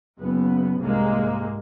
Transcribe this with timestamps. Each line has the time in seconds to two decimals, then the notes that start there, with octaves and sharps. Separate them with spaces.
0.19 F#1 B3
0.79 F1 C2 G#2 G#3 A#3